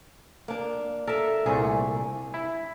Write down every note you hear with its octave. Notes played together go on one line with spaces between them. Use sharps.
A#3 D4
A4 A#4 E5
C2 A#2 A3 G#4
E4